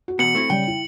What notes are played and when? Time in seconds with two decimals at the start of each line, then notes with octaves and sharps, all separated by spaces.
0.08 F#4
0.19 E2 G#2 B2 C#7 F#7
0.35 A3 C4 E4
0.50 C#3 G3 G5
0.67 E4